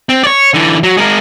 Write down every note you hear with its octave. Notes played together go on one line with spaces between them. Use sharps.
C4
C#5 D5
D3 E3
F#3
G#3 A#4